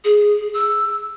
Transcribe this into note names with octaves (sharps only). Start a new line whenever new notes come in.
G#4
E6